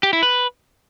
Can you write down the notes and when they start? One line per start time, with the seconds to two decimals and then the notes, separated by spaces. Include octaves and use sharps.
0.03 G4
0.13 E4
0.23 B4